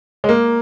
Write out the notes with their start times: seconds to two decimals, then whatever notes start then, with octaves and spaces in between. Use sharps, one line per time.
0.24 G#3
0.29 A#3